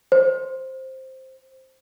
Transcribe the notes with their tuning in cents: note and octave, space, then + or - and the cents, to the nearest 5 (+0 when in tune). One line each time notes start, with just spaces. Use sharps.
C5 +5